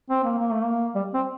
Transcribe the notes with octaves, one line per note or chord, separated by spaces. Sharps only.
C4
A#3
A#3
A3
A#3
G3
C4